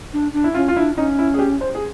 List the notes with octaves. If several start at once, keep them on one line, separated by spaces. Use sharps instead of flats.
D4
D4
E4
C#4 F4
F4
D4 E4
C#4 D#4
E4
G#4
G4
C5
G#4